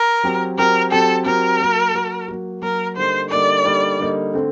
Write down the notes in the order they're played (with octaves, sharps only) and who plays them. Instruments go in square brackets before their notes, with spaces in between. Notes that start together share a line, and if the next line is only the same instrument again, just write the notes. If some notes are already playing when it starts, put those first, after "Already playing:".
Already playing: [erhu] A#4
[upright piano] F#3 C4 G4
[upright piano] F#3 C4 G4 [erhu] A#4
[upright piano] F#3 C4 G4 [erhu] A4
[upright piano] F#3 C4 G4 [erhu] A#4
[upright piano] F#3 A#3 F#4
F#3 A#3 F#4
F#3 A#3 F#4
[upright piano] F#3 A#3 F#4 [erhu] A#4
[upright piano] D3 G3 A#3 D#4 [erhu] C5
[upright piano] D3 G3 A#3 D#4 [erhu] D5
[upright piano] D3 G3 A#3 D#4
D3 G3 A#3 D#4
D3 A3 C4